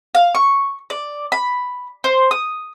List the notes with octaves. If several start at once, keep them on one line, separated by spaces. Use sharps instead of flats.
F5
C#6
D5
B5
C5
D#6